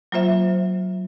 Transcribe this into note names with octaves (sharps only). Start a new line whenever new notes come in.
F#3 A#3 F4 C5 E5